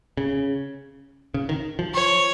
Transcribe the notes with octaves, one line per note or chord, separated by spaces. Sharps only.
C#3
C#3
D#3
F3
C#5